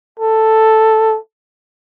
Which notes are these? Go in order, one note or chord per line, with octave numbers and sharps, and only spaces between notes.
A4